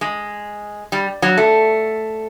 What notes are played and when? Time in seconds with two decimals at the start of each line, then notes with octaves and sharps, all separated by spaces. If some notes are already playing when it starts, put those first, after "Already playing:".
0.01 G#3
0.92 G3
1.22 F#3
1.38 A3